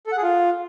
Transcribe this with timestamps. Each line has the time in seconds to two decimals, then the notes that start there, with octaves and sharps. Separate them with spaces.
0.07 A4
0.12 F#5
0.17 G#4
0.23 F4